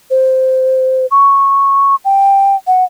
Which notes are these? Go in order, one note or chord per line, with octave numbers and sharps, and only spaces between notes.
C5
C#6
G5
F#5